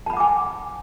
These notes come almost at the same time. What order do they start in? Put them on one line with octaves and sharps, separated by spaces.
A5 B5 F#5 D6 G#5